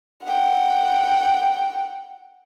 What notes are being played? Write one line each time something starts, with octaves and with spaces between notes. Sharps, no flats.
F#5 G5